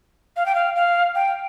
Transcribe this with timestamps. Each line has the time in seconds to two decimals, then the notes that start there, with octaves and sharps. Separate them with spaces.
0.37 F5
0.46 G5
0.55 F5
0.76 F5
1.15 G5